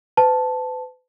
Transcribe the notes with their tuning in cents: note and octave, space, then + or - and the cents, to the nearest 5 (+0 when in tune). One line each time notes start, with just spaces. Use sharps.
B4 +40 A5 +0